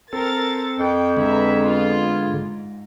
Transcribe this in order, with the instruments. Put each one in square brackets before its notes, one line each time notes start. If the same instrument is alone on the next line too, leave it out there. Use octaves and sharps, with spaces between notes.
[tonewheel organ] C4 A4 [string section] A#4 A6
[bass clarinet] F2 [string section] G5
[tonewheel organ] D3 G#3 [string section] B4 E5 A#5
[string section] B3 F4
G#2